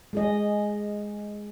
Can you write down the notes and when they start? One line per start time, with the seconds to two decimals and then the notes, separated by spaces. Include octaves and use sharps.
0.13 G#3 G#4 D#5